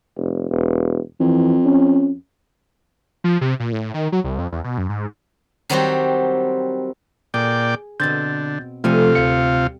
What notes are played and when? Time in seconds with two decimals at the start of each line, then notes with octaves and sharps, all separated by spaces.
0.17 F1
0.50 E1
1.20 F2 E3
1.65 C#4
3.24 F3
3.41 C3
3.60 A#2
3.72 A2
3.94 D#3
4.12 F#3
4.24 C2
4.39 F2
4.52 E2
4.64 B2
4.78 F#2
4.89 G#2
5.70 D#3 F#3 G3 C4 F#4 G4
7.34 A#2 G#4 D5 G5
8.00 B2 D3 C4 G6 A6
8.84 C3 F3 G3 A3 F4 A4 G#5
9.15 D2 F5 C#7